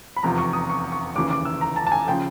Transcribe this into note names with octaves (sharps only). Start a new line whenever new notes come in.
B5
F1 E2 C3 F3 A#5
C#6
D#6
C#6
C#6
F1 D#2 C#3 E3 D6
D6
E6
A#5
A5
A5
G#5
C#3 F3 G5